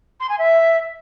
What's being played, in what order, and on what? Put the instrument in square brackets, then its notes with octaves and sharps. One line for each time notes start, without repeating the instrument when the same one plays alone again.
[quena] C6
G#5
E5